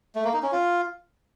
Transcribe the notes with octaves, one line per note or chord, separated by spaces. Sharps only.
A3
A#3
D#4
C#4
F4